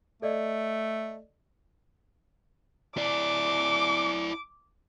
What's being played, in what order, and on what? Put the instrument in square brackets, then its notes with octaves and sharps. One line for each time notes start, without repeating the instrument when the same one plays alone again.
[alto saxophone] A3 [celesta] A4 D5 D#5
[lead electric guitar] E4 D5 [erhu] D6